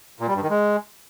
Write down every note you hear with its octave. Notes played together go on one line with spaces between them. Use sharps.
A#2
G3
G2
D#3
G#3